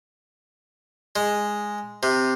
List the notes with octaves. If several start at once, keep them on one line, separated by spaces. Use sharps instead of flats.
G#3
C3